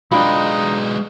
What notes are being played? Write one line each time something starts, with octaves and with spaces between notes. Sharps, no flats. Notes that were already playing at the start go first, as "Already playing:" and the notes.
B1 G#3 D4 D#4 F4 G5 B5